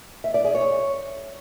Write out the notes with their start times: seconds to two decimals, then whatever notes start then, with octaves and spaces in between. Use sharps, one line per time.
0.24 E5
0.34 D5
0.44 G#4
0.55 C#5